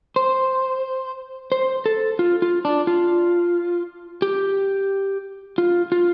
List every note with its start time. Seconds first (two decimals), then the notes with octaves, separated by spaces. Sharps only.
0.16 C5
1.52 C5
1.86 A4
2.19 F4
2.42 F4
2.65 D4
2.87 F4
4.22 G4
5.58 F4
5.92 F4